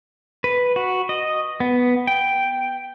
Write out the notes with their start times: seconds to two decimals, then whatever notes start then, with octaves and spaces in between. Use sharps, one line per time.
0.44 B4
0.76 F#4
1.09 D#5
1.60 B3
2.07 G5